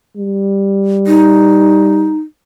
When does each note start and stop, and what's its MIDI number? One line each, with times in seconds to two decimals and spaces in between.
0.17 2.14 55
1.07 2.17 63